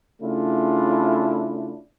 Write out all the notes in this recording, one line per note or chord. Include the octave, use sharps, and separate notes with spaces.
C#3 A3 C#4 D4 E4 F4